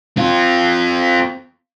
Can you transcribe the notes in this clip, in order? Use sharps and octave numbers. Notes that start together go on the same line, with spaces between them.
C4 F4